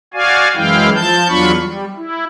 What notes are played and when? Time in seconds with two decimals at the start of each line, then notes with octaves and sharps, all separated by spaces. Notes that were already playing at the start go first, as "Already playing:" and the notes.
0.14 F#4 D5 F5 G#5
0.56 F#2 E3 G#3 E4 F5 G5
0.95 F3 A5 G6
1.28 E2 F#3 D4 F4 B5 C#6
1.60 G3
1.96 E4